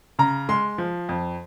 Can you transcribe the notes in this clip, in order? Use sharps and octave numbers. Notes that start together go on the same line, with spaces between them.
C#3 A#5
G#3 C6
F3
F2